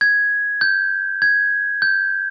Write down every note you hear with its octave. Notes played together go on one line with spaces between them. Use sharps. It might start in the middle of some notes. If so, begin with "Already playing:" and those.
G#6
G6
G#6
G6